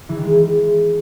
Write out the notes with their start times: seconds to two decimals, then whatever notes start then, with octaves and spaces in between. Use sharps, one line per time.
0.09 E3
0.17 D#3
0.24 G#3